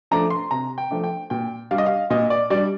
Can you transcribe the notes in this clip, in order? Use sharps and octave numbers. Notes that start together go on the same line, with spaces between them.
F3 A3 D4 A#5
C6
C3 A#5
G5
F3 A3 D4
G5
A#2 G5
G3 D4 F5
D#5
F5
A#2 D#5
D5
G3 D4 D5